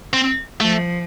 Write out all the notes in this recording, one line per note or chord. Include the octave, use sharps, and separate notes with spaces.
C4
F3 A3